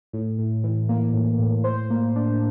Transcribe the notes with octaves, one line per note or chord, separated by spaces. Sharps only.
A2
A2
E3
A#3
A2
A2
C5
A#3
D4